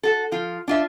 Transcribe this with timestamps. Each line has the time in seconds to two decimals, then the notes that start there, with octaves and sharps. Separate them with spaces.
0.03 F#4 A4
0.32 F3 F4
0.68 D4 F4 E5